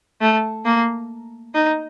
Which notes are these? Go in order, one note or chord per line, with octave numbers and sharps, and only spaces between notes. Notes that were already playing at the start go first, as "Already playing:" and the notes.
A3
A#3
D#4